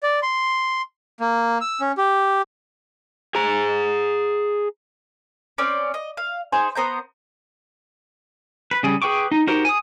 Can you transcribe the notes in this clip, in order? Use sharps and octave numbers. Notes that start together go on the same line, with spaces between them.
D5
C6
A#3
E6
C#4
G4
G#4 A#5
C4 C#4 D5
D#5
F5
D#4 G#4 C5
B3 C5 A#5 G6
B4
C#3 G3 G#4
G#4 B4 G5 C#6 D6
D#4
D#4 F#4 G4 A#4 C5
G#5 D#6